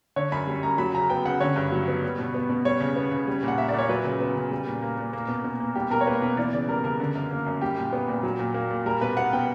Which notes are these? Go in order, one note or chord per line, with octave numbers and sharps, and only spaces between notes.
D3 C#5
F#2 B5
G3
F#2 A#5
F#3 B5
C#3 A#5
B3 G5
C#3 F#5
D3 C#5
G2
F#3
B3
G3
B2
B3
B2
G3 C#5
C#3
B3
C#3
G3
A#2
F#5
A#3 E5
A#2 D5
C#5
F#3 B4
C#3
B3
C#3
G3
A#2
A#3
A#2
A#3
B2
B2
A#3
G3 G4
B2 A#4
C#5
A#3 B4
B2 B4
E3 D5
C#3 D5
G3 A#4
C#3 A#4
D3
F#2
A#3
F#2
G3 G4
A#2
B3
A#2
F#3
A#2
A#3
A#2
G3 A#4
B2 B4
B3 F#5
B2 G5